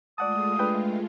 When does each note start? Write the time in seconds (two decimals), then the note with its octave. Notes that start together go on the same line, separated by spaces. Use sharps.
0.18 G#3 A3 F4 D5 F#5 A5 D#6
0.59 D4 B4 G5